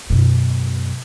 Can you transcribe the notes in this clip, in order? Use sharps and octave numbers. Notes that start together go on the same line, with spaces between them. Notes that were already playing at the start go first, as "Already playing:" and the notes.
F#2 B2